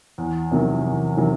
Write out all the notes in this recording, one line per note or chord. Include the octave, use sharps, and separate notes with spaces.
E2
C3 D#3 F#3
E2
C3 D#3 F#3